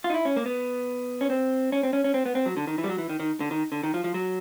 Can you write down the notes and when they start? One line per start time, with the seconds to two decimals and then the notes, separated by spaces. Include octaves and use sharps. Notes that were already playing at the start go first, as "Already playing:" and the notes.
0.04 F4
0.10 D#4
0.14 E4
0.25 C#4
0.36 A#3
0.46 B3
1.21 C#4
1.30 C4
1.72 C#4
1.83 C4
1.93 C#4
2.04 C#4
2.14 C4
2.25 B3
2.35 C4
2.46 F#3
2.57 D3
2.67 D#3
2.78 E3
2.84 G3
2.89 F#3
2.98 E3
3.09 D#3
3.20 D#3
3.40 D3
3.51 D#3
3.72 D3
3.83 D#3
3.94 F3
4.04 F3
4.14 F#3